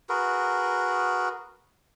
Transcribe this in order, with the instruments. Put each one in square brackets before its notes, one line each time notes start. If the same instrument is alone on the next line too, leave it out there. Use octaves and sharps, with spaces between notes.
[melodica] F#4 G#4 A#4 B4